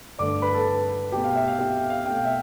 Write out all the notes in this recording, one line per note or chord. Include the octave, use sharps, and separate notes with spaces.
G2 D3 A3 D5 D6
B4 B5
A4 A5
B2 A3 G4 G5
F5
E5
F5
G4 G5
F5
F5
B2 A3 G5
F5
E5